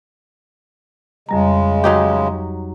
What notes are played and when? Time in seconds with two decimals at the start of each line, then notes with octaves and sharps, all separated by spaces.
1.29 F2 C#3 G3 G#3 A#5
1.84 F#3 D#4 G4